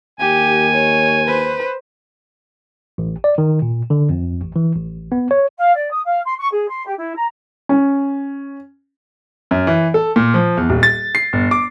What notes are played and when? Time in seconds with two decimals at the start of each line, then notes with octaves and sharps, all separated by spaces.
0.20 D#2 G4 G#5
0.73 C#5
1.27 B4 C5
2.98 A1
3.24 D5
3.38 D#3
3.62 A#2
3.90 D3
4.09 F2
4.42 A1
4.56 E3
4.75 A1
5.12 B3
5.31 C#5
5.57 F5
5.74 D5
5.90 D#6
6.05 F5
6.25 C6
6.37 C#6
6.51 G#4
6.68 C6
6.85 G4
6.98 E4
7.16 A#5
7.69 C#4
9.51 F#2
9.67 E3
9.94 A4
10.16 A#2
10.34 F3
10.57 E2
10.70 D#1
10.83 A6
11.15 C7
11.33 G1
11.51 D6